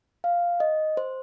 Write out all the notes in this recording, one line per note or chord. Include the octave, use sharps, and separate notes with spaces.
F5
D#5
C5